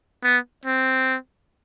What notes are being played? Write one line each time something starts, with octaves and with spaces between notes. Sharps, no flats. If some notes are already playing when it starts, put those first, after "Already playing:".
B3
C4